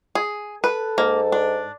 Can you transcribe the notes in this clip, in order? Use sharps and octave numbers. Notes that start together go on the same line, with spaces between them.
G#4
A4 B4
G#2 A#3
D4